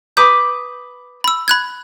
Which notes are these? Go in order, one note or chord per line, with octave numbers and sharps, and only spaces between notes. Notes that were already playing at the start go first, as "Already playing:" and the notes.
B4 D6 D#6 G6
B5 E6
B5 F#6 G#6